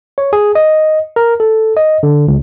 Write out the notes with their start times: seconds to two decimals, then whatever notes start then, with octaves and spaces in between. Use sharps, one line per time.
0.18 C#5
0.33 G#4
0.55 D#5
1.16 A#4
1.40 A4
1.77 D#5
2.03 D3
2.28 C#2